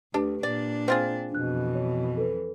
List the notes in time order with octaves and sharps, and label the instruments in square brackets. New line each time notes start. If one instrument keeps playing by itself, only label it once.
[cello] D2 [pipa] D4 [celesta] G4 B4
[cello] A#2 D4 [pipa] D5
[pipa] C4 F4 G#4 [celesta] G5 A6
[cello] F2 E3 [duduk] B2 [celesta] D4 F#6
[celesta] C#5
A4 B4